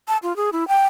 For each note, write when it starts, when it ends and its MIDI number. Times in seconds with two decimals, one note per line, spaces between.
0.08 0.17 81
0.23 0.35 65
0.36 0.50 68
0.52 0.67 64
0.68 0.86 79